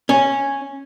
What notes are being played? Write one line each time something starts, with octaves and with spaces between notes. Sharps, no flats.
C#4